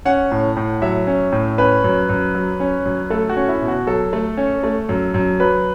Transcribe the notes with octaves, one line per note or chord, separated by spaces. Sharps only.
C#4 F#5
A2
A2
F#3 E5
C#4
A2
C#4 B4
F#2
F#2
F#3
C#4
F#2
A3 A4
F#4
C#4
E4
B2
F#4
F#3 A4
A3
C#4
A3
F#2
F#2
F#3 B4